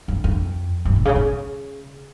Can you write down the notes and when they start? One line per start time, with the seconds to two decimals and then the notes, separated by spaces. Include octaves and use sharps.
0.08 F#2
0.24 F2
0.85 F#2
0.96 A#2
1.05 C#3
1.15 C#3